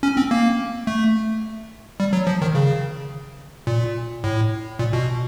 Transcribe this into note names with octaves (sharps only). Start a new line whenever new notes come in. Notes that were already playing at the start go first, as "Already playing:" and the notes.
C#4
C4
A#3
A3
G3
F#3
F3
D#3
C#3
A#2
A2
A#2
B2